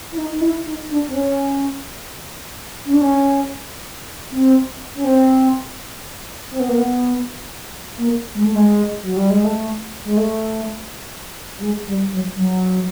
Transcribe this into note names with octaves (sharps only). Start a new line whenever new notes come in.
E4
D#4
D#4
E4
D#4
D4
C4
C#4
C#4
D4
C#4
C4
C#4
C4
C4
B3
A#3
B3
A#3
G#3
A3
G#3
F#3
G3
G#3
A3
G#3
A3
G3
G#3
G3
F#3
F#3